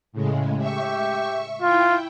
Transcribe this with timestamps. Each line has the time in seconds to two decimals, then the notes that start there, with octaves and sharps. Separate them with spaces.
0.13 A2 C#3 G#3
0.58 G4 E5 C#6
1.62 E4 F4 G5